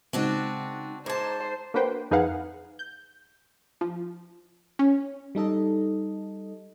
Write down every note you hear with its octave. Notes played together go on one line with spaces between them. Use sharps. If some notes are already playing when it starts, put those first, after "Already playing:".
C#3 G#3 C4 D4 D#4 F#4
G#2 C5 A5 A#5 D6 G#6
A#3 D4 F#4 B4 C5 G5
F2 D#4 G#4 B4 F5 F#5
G6
F3
C#4
G3 D#4 A4 D#5